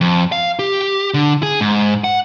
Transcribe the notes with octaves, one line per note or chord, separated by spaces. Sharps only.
F2
F5
G4
D3
G#4
G#2
F#5